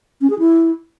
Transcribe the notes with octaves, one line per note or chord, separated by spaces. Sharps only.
C#4
G#4
E4